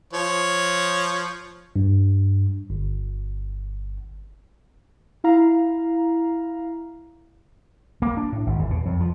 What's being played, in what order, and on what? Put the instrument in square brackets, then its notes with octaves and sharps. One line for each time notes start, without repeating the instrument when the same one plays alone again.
[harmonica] F3 C#5
[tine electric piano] G2
G1
[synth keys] E4 F5 A#5
[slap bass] A#3
D4
A2
G#1
E2
B2
F2
F3